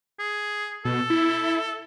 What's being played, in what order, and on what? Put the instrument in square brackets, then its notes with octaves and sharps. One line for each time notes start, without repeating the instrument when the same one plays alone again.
[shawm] G#4
[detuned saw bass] B2 [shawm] A4
[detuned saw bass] E4